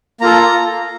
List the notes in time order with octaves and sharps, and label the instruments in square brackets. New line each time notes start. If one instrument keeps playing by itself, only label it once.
[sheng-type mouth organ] A#3 F4 A4 A#5